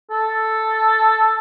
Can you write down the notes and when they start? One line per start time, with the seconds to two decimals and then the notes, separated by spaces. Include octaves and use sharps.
0.11 A4